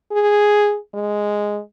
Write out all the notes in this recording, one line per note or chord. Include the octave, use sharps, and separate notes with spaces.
G#4
G#3